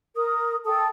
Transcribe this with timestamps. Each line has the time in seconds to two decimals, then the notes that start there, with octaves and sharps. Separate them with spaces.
0.16 A#4 D#6
0.65 A4 G5 A5 D#6